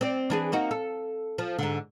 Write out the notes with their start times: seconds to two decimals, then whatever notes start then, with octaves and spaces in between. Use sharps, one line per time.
0.01 C4 D5
0.30 E3 D4 G#4
0.52 A#3 D#4 F#4
0.71 A4
1.38 F3
1.58 G#2 D3